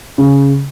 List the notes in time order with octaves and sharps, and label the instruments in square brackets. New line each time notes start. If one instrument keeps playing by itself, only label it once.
[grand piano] C#3